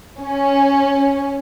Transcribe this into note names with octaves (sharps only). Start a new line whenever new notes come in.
C#4